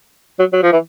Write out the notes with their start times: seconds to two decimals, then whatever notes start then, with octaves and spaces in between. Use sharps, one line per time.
0.39 F#3
0.53 F#3
0.63 F3
0.72 E3